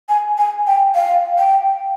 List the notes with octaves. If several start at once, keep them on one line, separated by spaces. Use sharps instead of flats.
G#5
G#5
G5
F5
G5